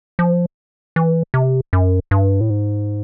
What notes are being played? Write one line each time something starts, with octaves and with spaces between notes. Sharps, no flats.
F3
E3
C3
F#2
G2
A2
G#2